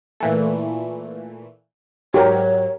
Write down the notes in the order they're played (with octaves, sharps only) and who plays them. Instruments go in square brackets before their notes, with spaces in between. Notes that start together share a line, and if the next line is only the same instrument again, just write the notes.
[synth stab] A#2 E3 A3
[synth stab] G#2 F#3 [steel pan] G4 A#4 [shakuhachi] C#5